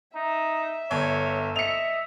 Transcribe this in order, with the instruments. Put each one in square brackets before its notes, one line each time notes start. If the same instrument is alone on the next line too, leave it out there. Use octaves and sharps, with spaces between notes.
[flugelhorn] D#4 [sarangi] E5
[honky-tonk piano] G1 [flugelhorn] C#5
[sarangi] D#5 [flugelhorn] E5 [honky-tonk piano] C#7 F7